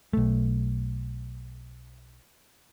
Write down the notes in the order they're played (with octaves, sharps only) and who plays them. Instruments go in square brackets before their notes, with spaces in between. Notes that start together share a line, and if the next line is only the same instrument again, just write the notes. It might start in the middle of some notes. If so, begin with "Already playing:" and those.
[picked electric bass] B1 A3